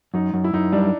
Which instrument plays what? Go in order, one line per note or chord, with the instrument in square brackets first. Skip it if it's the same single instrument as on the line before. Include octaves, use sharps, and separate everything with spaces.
[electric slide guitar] F#2 [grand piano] D#4
[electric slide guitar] F#2
[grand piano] E4
[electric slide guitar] F#2 [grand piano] D#4
[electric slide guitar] G3 [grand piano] D4